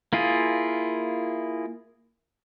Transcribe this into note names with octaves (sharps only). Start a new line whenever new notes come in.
A#3 E4 F4 G#4